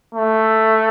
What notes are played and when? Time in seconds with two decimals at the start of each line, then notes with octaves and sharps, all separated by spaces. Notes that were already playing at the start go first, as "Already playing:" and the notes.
0.15 A3